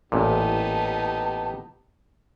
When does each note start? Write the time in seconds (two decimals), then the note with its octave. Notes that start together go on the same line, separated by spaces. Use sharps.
0.12 A1 A#2 B3 D#4 G4 A5